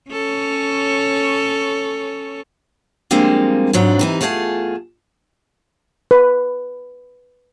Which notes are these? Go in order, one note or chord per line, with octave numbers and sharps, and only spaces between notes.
C#4 A4 C#5
F3 G3 G#3 A#3 C4 D4
F2 G#2 F#3 D4
C3 E3 D#4
E2 A3 F4 G#4 E5 A5
B4